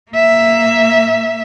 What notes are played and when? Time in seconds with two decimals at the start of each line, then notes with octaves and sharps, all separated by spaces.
0.11 A#3 E5